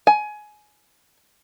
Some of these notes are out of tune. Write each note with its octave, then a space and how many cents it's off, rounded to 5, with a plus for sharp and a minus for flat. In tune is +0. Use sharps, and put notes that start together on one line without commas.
G#5 +20